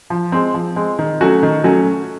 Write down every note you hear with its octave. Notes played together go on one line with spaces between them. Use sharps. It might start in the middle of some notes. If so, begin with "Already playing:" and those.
F3
G#3 C4
F3
G#3 C4
D#3
F#3 A3 C#4 F#4
D#3
F#3 A3 C#4 F#4